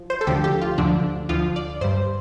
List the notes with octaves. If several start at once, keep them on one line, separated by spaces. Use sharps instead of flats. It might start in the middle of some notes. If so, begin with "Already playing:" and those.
Already playing: F3
C5
A4
D2 D3 F3 G4
G4
F4
D2 D3 F3 D4
D2 D3 F3 F4
D5
G2 G3 C5